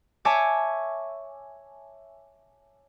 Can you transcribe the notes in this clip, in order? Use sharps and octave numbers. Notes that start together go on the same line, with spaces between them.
C#5 E5 G#5 A5 C#6 D6